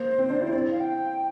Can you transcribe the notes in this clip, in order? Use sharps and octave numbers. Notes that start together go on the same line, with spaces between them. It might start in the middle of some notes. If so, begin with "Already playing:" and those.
Already playing: A#3 C5
C4
D4
E4
C4 D5
F5
G5